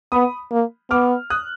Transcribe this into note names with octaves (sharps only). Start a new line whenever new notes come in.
B3 B5 D#6
A#3
B3 D6 F6
D#6 F#6